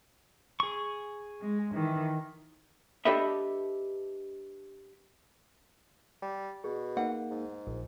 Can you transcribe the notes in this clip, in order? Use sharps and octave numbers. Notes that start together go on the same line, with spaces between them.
G#4 C#6
G#3
D#3 E3
D4 G4 A4 B4 D#5 E5
G3
B2 G#4
A#3 D#4 F#5
G#2
A#1